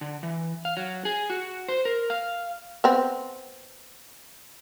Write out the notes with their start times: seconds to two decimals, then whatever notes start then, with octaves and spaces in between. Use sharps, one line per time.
0.01 D3
0.23 E3
0.65 F5
0.77 F#3
1.05 G#4
1.30 F#4
1.69 C5
1.85 A#4
2.10 F5
2.84 B3 C4